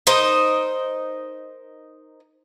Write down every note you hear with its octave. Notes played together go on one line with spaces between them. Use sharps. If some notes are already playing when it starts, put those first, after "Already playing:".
D#4 A#4 C5 D#5